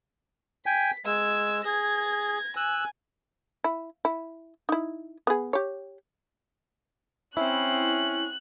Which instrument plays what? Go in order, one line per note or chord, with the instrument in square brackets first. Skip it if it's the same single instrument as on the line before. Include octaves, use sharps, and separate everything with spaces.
[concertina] G5 G#5 [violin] B6
[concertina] G#3 [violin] E6 G#6
[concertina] G#4 [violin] G#6 A#6
[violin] G#5 [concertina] E6 F#6
[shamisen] E4
E4
D#4 E4
B3 G#4
G4 C#5
[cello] C4 [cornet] C#4 [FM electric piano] E4 [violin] F#6